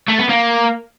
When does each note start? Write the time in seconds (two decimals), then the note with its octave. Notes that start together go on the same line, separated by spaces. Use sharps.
0.09 A3
0.19 B3
0.29 A#3